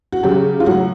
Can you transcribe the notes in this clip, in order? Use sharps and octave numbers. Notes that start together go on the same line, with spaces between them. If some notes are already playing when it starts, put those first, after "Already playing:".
F#4
C#3 F#3 G4
F4
A2 F#3 F#4